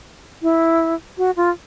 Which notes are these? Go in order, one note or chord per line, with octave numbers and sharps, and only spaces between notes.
E4
F#4
F4